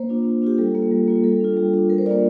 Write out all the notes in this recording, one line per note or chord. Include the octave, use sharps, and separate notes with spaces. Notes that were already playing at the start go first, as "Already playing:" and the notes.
Already playing: A#3 C5
D4 F4
A#3
D4 F4 G4
G3 A4
A#3 F4
G3
A#3 F4
G3 A4
D4 F4
G3
D4 F4
G3 A#4
C5
A#3 D4 F4 D5